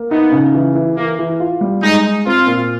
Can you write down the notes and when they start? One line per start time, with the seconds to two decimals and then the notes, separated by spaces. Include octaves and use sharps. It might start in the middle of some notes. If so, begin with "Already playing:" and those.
Already playing: A#3
0.11 B3 D#4
0.32 C#3
0.54 E3
0.75 E3
0.97 E3 A#3
1.19 E3
1.40 F4
1.61 G3
1.82 G#3 D#4
2.05 G#3
2.26 C4 F4
2.47 A#2